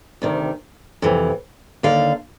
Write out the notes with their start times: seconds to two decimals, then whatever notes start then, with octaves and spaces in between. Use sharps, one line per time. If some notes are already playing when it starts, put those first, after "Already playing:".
0.22 D2 C3 D#3
1.02 F2 C3 E3
1.83 D#2 D3 F5